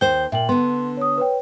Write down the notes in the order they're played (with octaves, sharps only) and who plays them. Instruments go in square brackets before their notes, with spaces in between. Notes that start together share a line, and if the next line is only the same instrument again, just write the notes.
[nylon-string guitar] D#2 C5 [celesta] G5 G6 G7
[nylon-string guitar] A#2 [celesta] E5 G5 F#7
[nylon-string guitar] D3 B3 [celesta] C6
[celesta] C#5 D#6
B4 C#5 G5